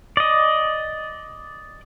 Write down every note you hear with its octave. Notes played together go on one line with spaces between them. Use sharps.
D5 D#5